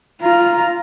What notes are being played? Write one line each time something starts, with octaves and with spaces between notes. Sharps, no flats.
F4 A#5